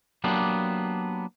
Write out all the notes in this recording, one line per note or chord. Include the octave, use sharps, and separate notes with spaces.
F#3 A#3 B3 D4 G4